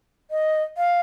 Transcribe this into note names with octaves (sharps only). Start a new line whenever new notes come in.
D#5
F5